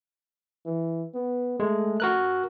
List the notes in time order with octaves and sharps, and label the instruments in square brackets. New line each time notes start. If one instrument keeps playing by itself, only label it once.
[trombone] E3
B3
[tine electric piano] G#3 [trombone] A3
[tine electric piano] F#4 A#4 F#6